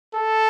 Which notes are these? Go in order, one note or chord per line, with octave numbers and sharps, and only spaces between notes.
A4